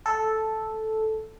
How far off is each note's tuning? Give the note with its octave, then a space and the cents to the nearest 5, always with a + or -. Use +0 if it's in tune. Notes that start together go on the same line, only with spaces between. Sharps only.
A4 -5